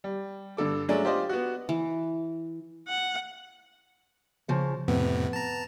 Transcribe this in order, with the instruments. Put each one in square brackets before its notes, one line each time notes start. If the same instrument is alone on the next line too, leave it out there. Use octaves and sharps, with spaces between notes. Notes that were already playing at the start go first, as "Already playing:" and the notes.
[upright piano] G3
G2 D3 A4 D6
F#3 G#3 A3 C#4 D4
F4 G4 C5 D5 D#5
B3 F#4
[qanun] E3
[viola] F#5
[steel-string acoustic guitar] C#3 F3 C#5
[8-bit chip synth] F2 A2 C3 [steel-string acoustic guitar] B3
[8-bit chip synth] A5 A#5